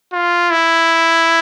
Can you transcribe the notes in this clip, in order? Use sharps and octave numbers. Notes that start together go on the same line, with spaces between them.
F4
E4